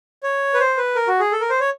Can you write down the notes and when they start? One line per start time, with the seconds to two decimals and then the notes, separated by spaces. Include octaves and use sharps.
0.23 C#5
0.54 B4
0.60 C5
0.78 B4
0.96 A#4
1.08 F#4
1.20 G#4
1.32 A4
1.41 A#4
1.50 C5
1.60 C#5